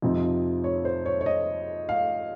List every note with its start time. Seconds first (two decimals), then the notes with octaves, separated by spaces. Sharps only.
0.02 F2 C3 F3 C4 D#4
0.64 C#5
0.85 C5
1.06 C#5
1.21 C#5
1.26 D#5
1.89 F5